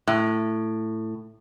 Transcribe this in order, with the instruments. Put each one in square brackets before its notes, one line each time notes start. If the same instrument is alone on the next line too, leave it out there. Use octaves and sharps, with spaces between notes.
[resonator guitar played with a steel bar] A2